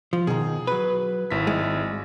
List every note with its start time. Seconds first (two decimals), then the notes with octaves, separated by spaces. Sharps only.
0.13 F3
0.27 B2 D#3 G#4
0.67 F#3 B4
1.31 G#1 E4 B6
1.47 G#3